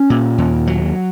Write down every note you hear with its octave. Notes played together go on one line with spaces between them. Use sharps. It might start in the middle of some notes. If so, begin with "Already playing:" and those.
Already playing: C#4
A#2
D#2
F#3